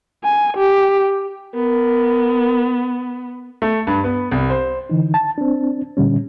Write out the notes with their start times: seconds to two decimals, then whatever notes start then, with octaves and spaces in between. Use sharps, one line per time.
0.24 G#5
0.57 G4
1.55 B3 A#4
3.62 A3
3.87 G2
4.04 B3
4.31 C2
4.50 C5
4.89 D3 E3 D#4
5.14 A5
5.38 C4 D4
5.97 A#2 D3 G3 C#4